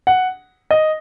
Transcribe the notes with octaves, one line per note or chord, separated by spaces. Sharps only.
F#5
D#5